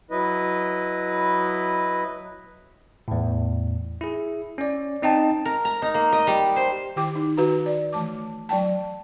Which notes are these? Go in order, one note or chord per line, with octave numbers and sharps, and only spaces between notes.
F#3 E4 B4 D#5
E2 A2
E4 G#4
C#4 D5
C4 D#4 D#5 G5 A5
A#4
A#5
D#4
A#3
D#5
G3
C5
D#3 E4 G4 G5 D6
D#4
D#3 F#4 B4 A#5
D5
E3 A3 A5 D6
F#3 D5 G5 A5